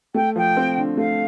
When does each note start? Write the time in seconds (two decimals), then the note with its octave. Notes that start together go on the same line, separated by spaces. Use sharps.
0.14 A3 G5
0.36 F3 G5
0.57 C4
0.77 D3
0.97 A3 F5